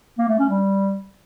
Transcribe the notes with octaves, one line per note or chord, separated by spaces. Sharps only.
A#3
A3
C#4
G3